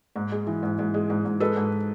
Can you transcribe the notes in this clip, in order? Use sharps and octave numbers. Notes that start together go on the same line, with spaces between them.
G#2
G#3
E3
G#2
G#2
G#3
G#2
G#2
G#3 A4 B4
G#2